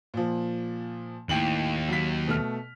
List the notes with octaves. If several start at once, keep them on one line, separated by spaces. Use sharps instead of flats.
A#2 F3
D#2 A2 G5 F#7
F#3 B6
B2 A3 F6